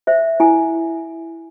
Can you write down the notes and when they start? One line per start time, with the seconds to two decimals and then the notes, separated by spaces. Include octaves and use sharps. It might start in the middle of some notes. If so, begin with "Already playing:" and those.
0.07 C5 E5
0.40 E4 G#5